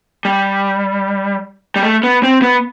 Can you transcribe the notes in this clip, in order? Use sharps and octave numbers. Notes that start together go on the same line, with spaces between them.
G3
G3
A3
B3
C4
B3